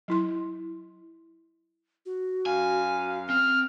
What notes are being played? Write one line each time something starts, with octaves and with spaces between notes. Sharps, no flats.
F#3 E4 C6
F#4
F#2 F5 G#5
C4 F6